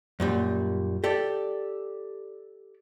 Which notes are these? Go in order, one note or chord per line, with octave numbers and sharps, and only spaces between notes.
F#2 A#2 G3
G4 A4 D5